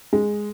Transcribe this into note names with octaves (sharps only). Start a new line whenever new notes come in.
G#3